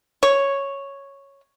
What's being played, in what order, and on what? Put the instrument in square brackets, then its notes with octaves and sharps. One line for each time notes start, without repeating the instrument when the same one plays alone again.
[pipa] C#5